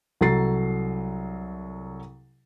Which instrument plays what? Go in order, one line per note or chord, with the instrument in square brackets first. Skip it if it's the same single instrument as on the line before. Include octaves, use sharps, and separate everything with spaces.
[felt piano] C2 F#3 A4 A#5 A6 C7